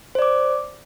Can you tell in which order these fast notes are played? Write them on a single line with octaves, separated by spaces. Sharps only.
C5 D5 D6